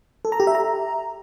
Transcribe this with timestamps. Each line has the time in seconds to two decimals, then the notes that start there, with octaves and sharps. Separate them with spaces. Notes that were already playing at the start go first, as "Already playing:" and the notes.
0.25 A4
0.32 A#5
0.40 G4
0.47 E5
0.55 A#5